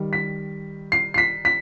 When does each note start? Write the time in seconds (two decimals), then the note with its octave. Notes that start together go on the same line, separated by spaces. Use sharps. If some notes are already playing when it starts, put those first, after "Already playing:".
Already playing: D#3 G3
0.13 B6
0.92 C7
1.14 C7
1.18 B6
1.45 B6